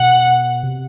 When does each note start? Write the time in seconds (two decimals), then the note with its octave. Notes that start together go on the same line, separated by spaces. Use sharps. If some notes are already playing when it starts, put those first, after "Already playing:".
Already playing: B2 F#5
0.63 C3